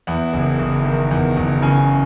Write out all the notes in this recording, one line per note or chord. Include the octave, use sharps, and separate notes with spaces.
E2 F#5
F#1
F#1
D#3
E2
F#1
C#3 G#5